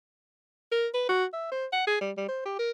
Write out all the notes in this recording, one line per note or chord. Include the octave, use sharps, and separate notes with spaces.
A#4
B4
F#4
E5
C5
F#5
G#4
G3
G3
C5
G4
A#4